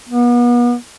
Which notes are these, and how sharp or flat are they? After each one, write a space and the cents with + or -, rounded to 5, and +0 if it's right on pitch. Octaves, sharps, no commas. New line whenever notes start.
B3 -35